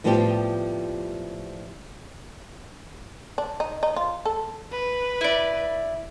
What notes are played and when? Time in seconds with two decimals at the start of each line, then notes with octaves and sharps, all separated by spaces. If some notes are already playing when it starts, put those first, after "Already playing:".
0.04 A2 F3 G3 B3 C4 G4
3.38 D4
3.60 D#4
3.83 D#4
3.96 F4
4.25 A4
4.72 B4
5.21 E4 D5